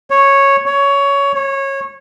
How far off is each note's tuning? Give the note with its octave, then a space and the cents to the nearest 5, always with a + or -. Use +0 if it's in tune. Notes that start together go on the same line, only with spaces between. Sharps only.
C#5 -5
C#5 +15
C#5 -20